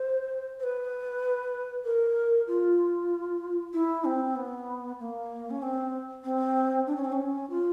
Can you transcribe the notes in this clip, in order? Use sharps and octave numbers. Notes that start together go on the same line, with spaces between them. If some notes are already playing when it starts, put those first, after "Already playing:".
Already playing: C5
C5
B4
A#4
F4
E4
C4
B3
A#3
C#4
C4
C4
D4
C#4
C4
C#4
F4